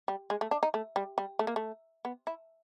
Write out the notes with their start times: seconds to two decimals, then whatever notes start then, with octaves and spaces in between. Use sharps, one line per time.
0.08 G3
0.30 G#3
0.41 A3
0.51 D4
0.63 D#4
0.74 A3
0.96 G3
1.18 G3
1.39 A3
1.47 A#3
1.56 A3
2.05 B3
2.27 E4